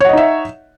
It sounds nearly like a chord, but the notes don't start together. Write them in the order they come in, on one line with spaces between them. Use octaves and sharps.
C#5 F#5 D#5 D#4 E5